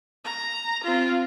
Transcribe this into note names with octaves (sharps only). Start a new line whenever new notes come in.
A#5
C4 F4